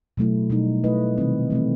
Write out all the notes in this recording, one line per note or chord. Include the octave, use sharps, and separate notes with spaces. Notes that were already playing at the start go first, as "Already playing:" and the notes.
B2 F#3 A3 E4
B2 G3 D#4
A3 E4 B4 D#5
C3 D#3 G3 C4
E3 A3 C4